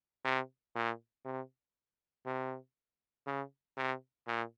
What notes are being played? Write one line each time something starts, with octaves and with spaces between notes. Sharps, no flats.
C3
A#2
C3
C3
C#3
C3
A#2